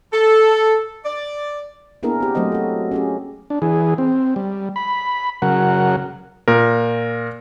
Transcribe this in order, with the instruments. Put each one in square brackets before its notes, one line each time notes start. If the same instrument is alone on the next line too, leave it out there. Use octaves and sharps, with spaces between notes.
[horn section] A4
D5
[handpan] A#3 B3 D4 E4 G#4 A#4
C4 G4
F#3 A3 A#3 C4 C5 D#5
F#4 A4
C#4 G4 G#4
[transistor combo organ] D4
E3 G#4
C4
G3
B5
C#3 F#3 A#4 F#5
[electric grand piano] A#2 A#4